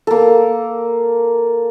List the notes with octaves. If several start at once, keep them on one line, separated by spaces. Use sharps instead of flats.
A#3 A4